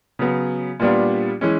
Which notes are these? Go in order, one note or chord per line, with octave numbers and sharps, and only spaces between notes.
C#3 F#3 B3
A#2 G3 B3 D4 F4
E3 G#3 C#4